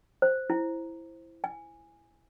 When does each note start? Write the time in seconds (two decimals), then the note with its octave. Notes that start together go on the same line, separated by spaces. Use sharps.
0.22 C5
0.50 E4
1.44 G#5